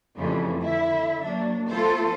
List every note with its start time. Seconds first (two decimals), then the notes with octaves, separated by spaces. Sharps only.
0.16 F2 A2 C#3 E3 F3 G3
0.61 D3 E4 E5
1.22 F#3 A#3 D4
1.69 F3 A3 B3 F4 A4 C5